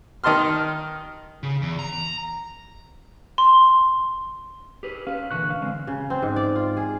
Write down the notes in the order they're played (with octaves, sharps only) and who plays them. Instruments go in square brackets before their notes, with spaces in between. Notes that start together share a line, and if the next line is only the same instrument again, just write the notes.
[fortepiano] D#3 D#5 A5 C6 F6
[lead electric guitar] C#3
E2
A#5
[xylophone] C6
[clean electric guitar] G4 G#4 B4
[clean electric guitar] C#4 B4 [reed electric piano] F5
[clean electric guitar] A#2 D3 E3 [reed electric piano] C#6 F#6
[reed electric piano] F5
[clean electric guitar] D3 G#3 C4
[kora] C#3
C4
G#2
D5
F4
G#4